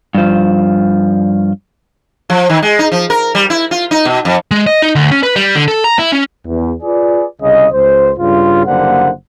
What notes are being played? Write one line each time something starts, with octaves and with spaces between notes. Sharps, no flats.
G2 F3
F3
D#3
G#3
D#4
F3
A#4
G3
E4
F4
D#4
B2
F2
G#3
D#5
D#4
D2
C#4
B4
G3
D3
A4
A#5
E4
C#4
E2
F4 G#4 B4 D5
C2 C#3 G#4 D#5
C#2 C5
G2 C#3 F4
F#1 D3 G3 A#3 C5 F#5